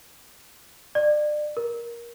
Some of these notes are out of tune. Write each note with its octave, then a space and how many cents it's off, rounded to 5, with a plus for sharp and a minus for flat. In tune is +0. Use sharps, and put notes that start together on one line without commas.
D5 +30
A#4 +15